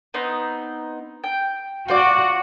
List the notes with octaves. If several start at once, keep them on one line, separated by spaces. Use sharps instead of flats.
B3 C4 D#4
G5
F4 F#4 C5 D5